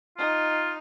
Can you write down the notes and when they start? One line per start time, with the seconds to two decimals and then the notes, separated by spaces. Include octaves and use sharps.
0.18 D#4 F4